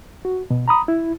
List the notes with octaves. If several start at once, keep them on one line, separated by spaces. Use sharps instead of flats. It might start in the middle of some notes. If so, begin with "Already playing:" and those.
F#4
B2
A#5 B5 D#6
E4